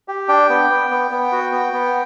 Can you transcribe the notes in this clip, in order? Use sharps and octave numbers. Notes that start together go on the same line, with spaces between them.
G4
D4 G5
B3
B3
B3
B3
F#4
B3
B3